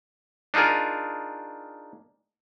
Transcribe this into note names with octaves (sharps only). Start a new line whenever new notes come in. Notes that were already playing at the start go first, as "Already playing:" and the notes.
D4 D#4 F4 G#4 A#4